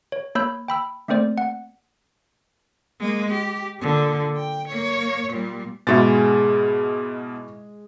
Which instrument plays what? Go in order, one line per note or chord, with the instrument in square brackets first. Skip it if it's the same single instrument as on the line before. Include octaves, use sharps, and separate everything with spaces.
[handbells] C#5
A#3 C#5 B5 E6 G6
G5 B5 E6
A3 A#3 C4 C5 D5
F#5
[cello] G#3 A#3
G4
A#2 D3
G5
A#3 C#5
A#2 G3
[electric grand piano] G#2 B2 [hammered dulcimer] G#3 G#4 [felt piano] E4 F#4 A6